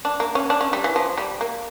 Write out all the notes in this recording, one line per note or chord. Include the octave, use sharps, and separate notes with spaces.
D4
A#3
C#4
D4
C#4
G3
E3
F3
G3
A#3